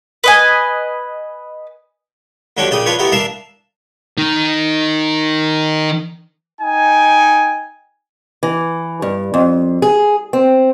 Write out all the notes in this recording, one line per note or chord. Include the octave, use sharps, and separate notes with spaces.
B4 D#5 G#5
D#2 D3 F#3 D4 C#5 G5
A#1 C#3 D5 G5 D#6
D4 F4 B4 C#5
A3 B3 E4 G4 A#4
D4 A#4 E5 F5 A5
D#3 D#4
D#4 G5 G#5
E3
G2
F2
G#4
C4